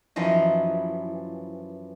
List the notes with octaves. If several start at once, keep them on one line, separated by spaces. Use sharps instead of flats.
F#2 E3 F3 D#5